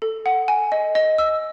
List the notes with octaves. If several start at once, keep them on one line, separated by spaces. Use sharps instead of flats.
A4
F#5
G#5
D#5
D#5
E6